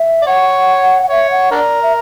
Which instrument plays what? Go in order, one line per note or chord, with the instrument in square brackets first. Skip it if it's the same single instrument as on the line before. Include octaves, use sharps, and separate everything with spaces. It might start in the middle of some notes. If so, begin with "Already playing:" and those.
Already playing: [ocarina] E5
[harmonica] D5
[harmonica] C#5 [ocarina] F#5
[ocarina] F#5
[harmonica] C#5 [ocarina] E5
[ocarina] F#5
[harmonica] D4 A#4 [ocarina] D5
[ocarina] E5